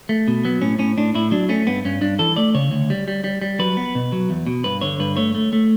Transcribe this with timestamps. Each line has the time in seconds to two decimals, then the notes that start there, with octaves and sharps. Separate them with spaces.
0.09 A3
0.28 B2
0.45 F#3 B3
0.61 A2 C#4
0.79 A2 C#4
0.98 A2 D4
1.15 A2 E4
1.31 F#3 D4
1.49 A3 C#4
1.67 G2 B3
1.85 G2 C#4
2.02 G2 D4
2.19 E3 A4
2.36 A3 D5
2.55 C#3 C#5
2.71 D2
2.90 G3
3.08 G3
3.24 G3
3.42 G3
3.59 F#3 B4
3.77 B3
3.95 B2
4.12 F#3
4.30 E2
4.47 B2
4.64 G2 B4
4.81 D3 C#5
5.00 G2 B4
5.17 A3 C#5
5.35 A3
5.53 A3